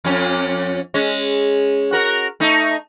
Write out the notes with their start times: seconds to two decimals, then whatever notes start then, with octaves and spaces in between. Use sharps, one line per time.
0.04 F2 C#4
0.94 G#3 C#4
1.92 F#4 A#4
2.40 A3 D#4